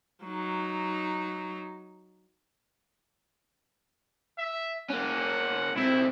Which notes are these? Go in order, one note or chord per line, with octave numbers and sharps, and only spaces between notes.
F#3 D#4
E5
A#3 C#4 F#5
B1 C4 E4